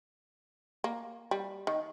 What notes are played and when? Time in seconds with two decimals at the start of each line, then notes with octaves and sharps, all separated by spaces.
0.84 A#3
1.31 G3
1.67 D#3